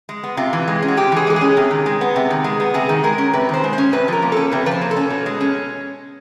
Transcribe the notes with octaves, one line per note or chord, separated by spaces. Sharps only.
G#3
B3
C3 F4
E3
G#3
C#4
F#4
C3 G4
E3 G#4
G#3 A4
G#4
C#4
C3
D#3
G#3
B3
C3
D#3
G#3
B3
C3 G#4
D#3
G#3 A#4
C#4
C3 B4
D#3 C5
G#3
C5
C#4
C3 B4
F3 A#4
A#3
C#4 A4
C3 B4
F3 B4
C5
A#3
A4
C#4
B2
G#3
C#4